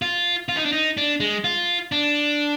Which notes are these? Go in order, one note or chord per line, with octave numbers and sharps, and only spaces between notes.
F4
F4
D#4
D4
D#4
D4
G#3
F4
D4